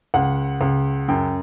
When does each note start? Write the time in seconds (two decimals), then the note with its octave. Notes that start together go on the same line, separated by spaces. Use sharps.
0.14 C#2 F#5
0.61 C#2
1.08 F#2 G5